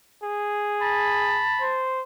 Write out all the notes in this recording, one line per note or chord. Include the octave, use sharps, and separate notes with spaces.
G#4
A5 B5
C5